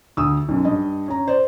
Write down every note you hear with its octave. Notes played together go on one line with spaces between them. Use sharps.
D2 D#6 E6
B1 F#2
G2 D#5
C#4 A#5
C5 D5